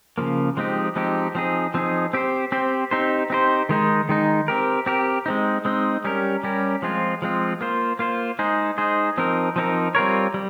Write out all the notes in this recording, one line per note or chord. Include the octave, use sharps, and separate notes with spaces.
C#3 F3 A#3
F3 G#3 C4 D#4 G4
F3 G#3 C4 D#4 G4
F3 C4 D#4 G#4
F3 C4 D#4 G#4
C4 G4 C5
C4 G4 C5
C4 D#4 G4 C5
C4 D#4 G4 C5
D#3 G#3 D#4
D#3 G#3 D#4
C4 G4 A#4
C4 G4 A#4
G#3 C4 D#4
G#3 C4 D#4
G3 C#4 G4 A#4
G3 C#4 G4 A#4
F3 G#3 C4 F4
F3 G#3 C4 F4
A#3 F4 C5
A#3 F4 C5
G#3 D#4 G#4 C5
G#3 D#4 G#4 C5
F3 C4 D#4 A#4
F3 C4 D#4 A#4
G3 C4 F4 A#4 C#5
G3